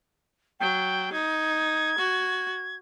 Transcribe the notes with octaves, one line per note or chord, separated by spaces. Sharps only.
F#3 G5
D#4 G#6
F#4